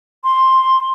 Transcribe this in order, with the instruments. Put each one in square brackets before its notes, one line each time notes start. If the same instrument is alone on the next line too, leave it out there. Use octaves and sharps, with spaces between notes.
[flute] C6